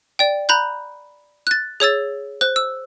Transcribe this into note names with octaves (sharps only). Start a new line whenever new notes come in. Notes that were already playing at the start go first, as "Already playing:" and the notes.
D5 G5
A#5 B5 F#6 G6
F#6 A6
G#4 C#5 E6 A6
C5 F#6
E6